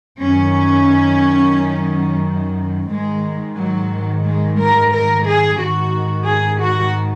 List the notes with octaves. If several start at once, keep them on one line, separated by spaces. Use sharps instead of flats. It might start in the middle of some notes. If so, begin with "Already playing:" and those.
F#2 D#3 C#4
G#2 D#3 G#3
F#3
G#3
A#4
A#4
G#4
G#2 D#3 F#4
G#4
F#4